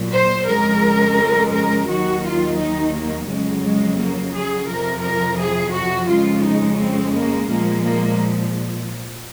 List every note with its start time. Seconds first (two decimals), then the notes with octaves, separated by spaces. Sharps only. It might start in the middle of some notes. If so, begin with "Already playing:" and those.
Already playing: A#2 F#3
0.13 C5
0.48 F2 C#3 G#3 A#4
1.54 A#4
1.88 D#2 D#3 F#3 F#4
2.24 F4
2.58 D#4
2.93 A#3
3.28 F2 C#3 F#3 G#3
3.63 G#3
3.98 A#3
4.34 G#4
4.68 F2 C3 F3 A#4
5.04 A#4
5.39 G#4
5.73 F#4
6.08 F2 C#3 G#3 F4
6.43 D#4
6.79 C4
7.13 A#3
7.49 A#2 F3 G#3 A#3
7.83 A#3